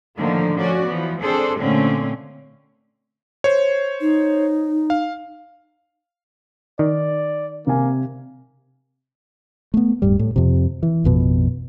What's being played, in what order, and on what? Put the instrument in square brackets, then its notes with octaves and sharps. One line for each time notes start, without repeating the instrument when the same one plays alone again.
[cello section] A2 D3 D#3 F3 A#3
F3 C#4 F#4 D5
E3 F3 B3
C4 D4 G#4 A4 C5
A#2 D3 A3 C4 C#4
[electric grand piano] C5 C#5
[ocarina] D#4
[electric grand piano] F5
[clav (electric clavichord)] D#3 [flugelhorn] D5
[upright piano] C3 G#5 [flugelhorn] A#3
[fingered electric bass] A3 B3
D1 G2 G3
A2
F2 C3
E3
A1 F2 B2